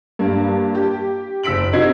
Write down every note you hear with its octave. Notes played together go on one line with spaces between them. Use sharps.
G2 A#3
G4
F#1 E6 B6 D7 F#7
C3 D#4 F#4 G#6 C7